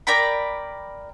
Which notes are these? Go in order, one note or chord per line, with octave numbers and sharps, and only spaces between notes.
A#4 D5 G5 B5